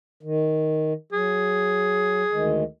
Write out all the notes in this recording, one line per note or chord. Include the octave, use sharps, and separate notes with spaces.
D#3
F#3 G#4
D2 D#3 G#3